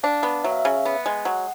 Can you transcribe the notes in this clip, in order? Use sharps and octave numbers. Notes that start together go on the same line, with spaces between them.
D4 F5
B3
F#3 E5
F5
E5
C#3
B3
G#3
F#3 F#5